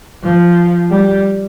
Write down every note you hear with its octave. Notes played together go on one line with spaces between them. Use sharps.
F3
G3